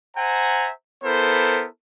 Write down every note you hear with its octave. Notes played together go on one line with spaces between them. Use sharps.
C5 E5 F#5 G#5 A#5
B3 E4 A4 A#4 C5